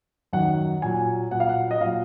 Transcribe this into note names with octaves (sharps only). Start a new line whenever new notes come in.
F#2 D#3 F#3 F#5
A#2 F#3 G#5
A#2 F#3 F#5
F5
F#5
D#5
A#2 F#3 F5